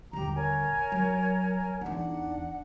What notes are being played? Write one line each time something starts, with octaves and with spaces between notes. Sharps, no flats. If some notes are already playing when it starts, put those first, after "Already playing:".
D#1 D3 G4 A#5
A#4 C#5 G#5
F#3
E2 D4 D#4 F#5